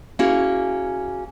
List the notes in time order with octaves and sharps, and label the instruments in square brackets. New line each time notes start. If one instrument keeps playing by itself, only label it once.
[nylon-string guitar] A#3 C#4 E4 F#4 G#4